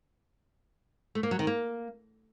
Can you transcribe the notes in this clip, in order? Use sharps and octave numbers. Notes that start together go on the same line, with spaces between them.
A3
A#3
F#3
D#3
A#3